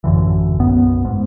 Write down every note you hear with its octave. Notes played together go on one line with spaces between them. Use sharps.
A1 F#2 D3 E3
B1 F#2 B3
G#2